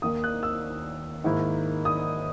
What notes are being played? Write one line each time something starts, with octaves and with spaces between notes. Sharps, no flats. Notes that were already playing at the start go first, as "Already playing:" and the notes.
D#2 D#3 A#3 D#4 D#6
F#6
E6
G#2 D#3 A#3 E4
D#6